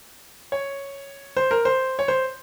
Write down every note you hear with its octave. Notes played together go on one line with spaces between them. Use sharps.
C#5
C5
A#4
C5
C#5
C5